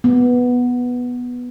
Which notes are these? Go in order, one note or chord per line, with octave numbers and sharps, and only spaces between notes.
B3